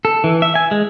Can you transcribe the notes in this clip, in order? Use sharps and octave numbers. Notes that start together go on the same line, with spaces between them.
A4
E3
E5
G#5
G#3